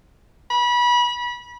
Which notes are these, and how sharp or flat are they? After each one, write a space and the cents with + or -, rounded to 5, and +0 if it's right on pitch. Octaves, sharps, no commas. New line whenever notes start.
B5 -30